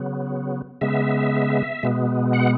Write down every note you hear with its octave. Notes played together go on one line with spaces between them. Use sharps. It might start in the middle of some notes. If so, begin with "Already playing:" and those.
Already playing: C#3 F#3 B3
C#3 G#3 B3 E5
B2 G#3 B3
F#5